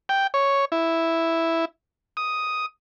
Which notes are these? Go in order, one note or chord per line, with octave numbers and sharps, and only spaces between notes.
G5
C#5
E4
D#6